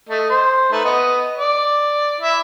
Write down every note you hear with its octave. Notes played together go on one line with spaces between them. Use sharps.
A3 D#5
C5
A3 D#4 B4
B3 B4 D#5
D5
E4 E5